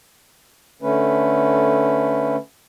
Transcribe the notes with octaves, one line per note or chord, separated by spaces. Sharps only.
D3 A3 C#4 B4